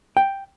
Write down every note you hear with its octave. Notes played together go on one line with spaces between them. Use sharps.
G5